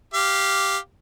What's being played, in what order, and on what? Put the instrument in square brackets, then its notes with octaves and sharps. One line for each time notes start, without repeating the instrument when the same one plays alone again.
[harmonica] G4 F5